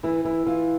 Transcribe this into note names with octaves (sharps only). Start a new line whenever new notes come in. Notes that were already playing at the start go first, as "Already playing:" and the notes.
E3 E4
E3 E4
E3 F4